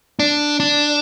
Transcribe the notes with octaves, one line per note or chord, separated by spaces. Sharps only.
D4
D4